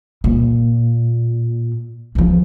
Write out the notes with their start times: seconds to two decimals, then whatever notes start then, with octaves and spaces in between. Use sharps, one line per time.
0.24 A#2
2.15 E3 F3